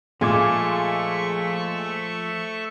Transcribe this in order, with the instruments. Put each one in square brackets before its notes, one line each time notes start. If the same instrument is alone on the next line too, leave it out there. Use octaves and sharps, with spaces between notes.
[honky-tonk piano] A#2 G#3 [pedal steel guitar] F3 G#5 D6 [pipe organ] A3 E5 C#6